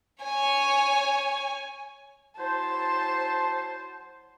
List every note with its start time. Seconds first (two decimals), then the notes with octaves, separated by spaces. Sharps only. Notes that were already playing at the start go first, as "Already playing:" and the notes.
0.23 C#5 G#5
2.38 F#3 E4 C5 A5